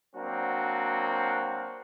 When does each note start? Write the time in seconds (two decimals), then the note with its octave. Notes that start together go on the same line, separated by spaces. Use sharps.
0.16 F#3 A#3 C4 D4 F#4